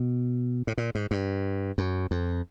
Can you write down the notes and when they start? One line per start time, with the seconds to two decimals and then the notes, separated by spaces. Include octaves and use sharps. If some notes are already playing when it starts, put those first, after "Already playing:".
Already playing: B2
0.67 A2
0.78 A#2
0.95 G#2
1.11 G2
1.78 F#2
2.11 F2